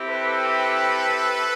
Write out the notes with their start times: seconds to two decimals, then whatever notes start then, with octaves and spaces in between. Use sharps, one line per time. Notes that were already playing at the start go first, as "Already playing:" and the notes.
Already playing: C4 E4 G4
0.08 A4 B4